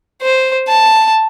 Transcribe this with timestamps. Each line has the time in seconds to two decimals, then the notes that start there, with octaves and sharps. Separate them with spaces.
0.22 C5
0.68 A5